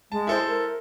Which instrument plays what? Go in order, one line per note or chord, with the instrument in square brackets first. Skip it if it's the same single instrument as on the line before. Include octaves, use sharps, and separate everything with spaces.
[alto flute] G#3 [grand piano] A5
[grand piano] E4 A4 C5
[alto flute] A#4